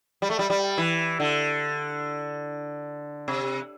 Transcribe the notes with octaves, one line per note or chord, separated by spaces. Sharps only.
G3
A3
G3
G3
E3
D3
C3